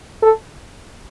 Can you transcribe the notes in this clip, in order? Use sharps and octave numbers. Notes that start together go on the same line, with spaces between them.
A4